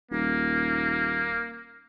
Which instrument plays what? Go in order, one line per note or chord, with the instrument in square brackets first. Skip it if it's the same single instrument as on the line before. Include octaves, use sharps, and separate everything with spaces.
[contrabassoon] D#1 [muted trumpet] A#3